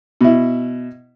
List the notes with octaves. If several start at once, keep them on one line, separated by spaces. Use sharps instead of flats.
B2 E4